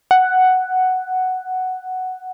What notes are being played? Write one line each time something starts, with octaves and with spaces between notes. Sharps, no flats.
F#5